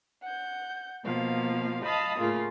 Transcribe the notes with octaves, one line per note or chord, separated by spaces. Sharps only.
F#5 G6
B2 F3 A#3 F5
D#5 F5 A5 B5 D#6
A2 C#3 A#3 F4